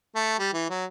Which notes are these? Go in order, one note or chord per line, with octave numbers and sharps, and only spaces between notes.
A3
G3
E3
F#3